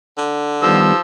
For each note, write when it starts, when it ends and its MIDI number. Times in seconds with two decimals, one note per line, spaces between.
0.17 0.78 50
0.63 0.92 51
0.63 1.00 53
0.63 0.92 55
0.63 0.92 59
0.63 1.00 88